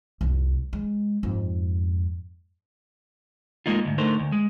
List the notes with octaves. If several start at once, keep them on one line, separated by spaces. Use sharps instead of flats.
F1 C2
G#3
F2 G#2
G#3 A#3 D#4 F4
D2 G#2
D3 A3 D#4 A#4 C5
D2
G#3